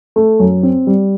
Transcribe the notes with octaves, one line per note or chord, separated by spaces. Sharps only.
A3
F#2
C4
G3